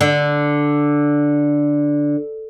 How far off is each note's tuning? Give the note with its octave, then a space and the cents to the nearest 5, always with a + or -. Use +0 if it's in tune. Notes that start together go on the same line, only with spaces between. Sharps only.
D3 +0